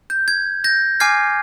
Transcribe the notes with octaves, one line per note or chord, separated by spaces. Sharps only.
G6
G#6
G6 A#6
G#5 D6 F6 G#6 C7